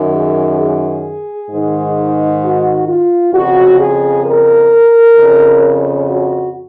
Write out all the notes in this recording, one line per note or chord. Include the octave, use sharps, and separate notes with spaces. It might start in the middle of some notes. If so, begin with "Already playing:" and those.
Already playing: F#2 D#3
G#4
G#4
G#2 D#3
F#4
F4
F2 C#3 F#4
G#4
A#4
F2 C#3
F#4